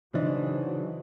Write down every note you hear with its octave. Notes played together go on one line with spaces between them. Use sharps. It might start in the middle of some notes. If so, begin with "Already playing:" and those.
C#3 E3 F#3 D4 D#4 C5 D#5